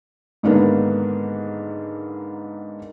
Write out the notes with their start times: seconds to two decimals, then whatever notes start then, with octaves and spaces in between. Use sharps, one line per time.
0.43 G#2 D3 D#3 A#3 B3 D4